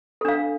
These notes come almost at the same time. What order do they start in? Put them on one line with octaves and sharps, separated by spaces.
A4 D4 F5